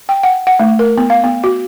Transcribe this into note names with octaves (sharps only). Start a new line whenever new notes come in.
G5
F#5
F#5
A3
A#4
B3
F5
B3
F#4